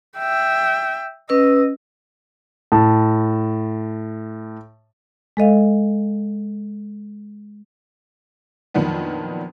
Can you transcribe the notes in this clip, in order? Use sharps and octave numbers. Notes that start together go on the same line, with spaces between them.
E5 G5
C#4 B4 D#5 E6
A2 A5
G#3 A4 D#5 F5
F2 A#2 D#3 F#3 B3 D4